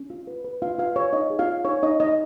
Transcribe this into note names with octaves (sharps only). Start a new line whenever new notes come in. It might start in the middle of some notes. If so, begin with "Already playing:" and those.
Already playing: C#4
F4
B4
B4
F4 F5
F4 B4 F5
F4 C#5
D#4 D#5
G#4
F4 F5
C#5
D#4 C#5
D#4 D#5
D#4 D#5